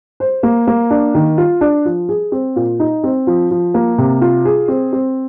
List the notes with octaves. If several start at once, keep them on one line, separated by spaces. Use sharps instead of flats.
C5
A#3
A#3
D4
D#3
F4
D4
F3
G#4
C4
A#2
D#4
C4
F3
F3
A#3
C3
F4
G#4
C4
C4